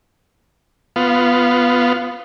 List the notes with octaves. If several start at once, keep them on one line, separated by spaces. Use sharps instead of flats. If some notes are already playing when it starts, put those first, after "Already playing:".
B3 F4